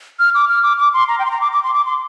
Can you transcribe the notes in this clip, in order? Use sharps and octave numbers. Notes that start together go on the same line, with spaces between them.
F6
D6
F6
D6
D6
C6
A#5
G5
C6
A#5
D6
D6
C6
D6
C6